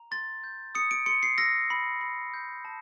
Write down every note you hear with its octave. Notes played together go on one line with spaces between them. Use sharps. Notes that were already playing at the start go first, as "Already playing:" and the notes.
Already playing: A#5
C6 A6
G6
D#6 C#7
D7
C6 C#7
C7
E6 A#6
B5
B5
G6
A5